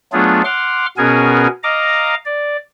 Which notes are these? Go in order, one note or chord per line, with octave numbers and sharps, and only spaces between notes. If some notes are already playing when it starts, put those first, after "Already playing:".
F#3 A3 B3 D4 F4 G#4
F#5 C6 D6 F6
B2 B3 C#4 G#4 A#4 G#5
D#5 F5 A#5 D6
D5